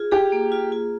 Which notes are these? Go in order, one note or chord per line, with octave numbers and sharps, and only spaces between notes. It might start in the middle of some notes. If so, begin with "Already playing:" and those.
Already playing: F4 G#4
G4 G#4
A#3
F4
F4